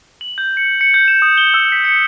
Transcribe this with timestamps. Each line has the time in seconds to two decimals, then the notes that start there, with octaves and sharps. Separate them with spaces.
0.21 F#7
0.38 G6
0.57 C#7
0.81 C#7
0.94 G6
1.08 E7
1.22 D#6
1.38 G7
1.54 E6
1.72 B6
1.84 C#7